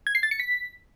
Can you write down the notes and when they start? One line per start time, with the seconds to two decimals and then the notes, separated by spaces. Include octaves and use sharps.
0.07 G#6
0.15 C7
0.23 A6
0.31 C#7
0.40 B6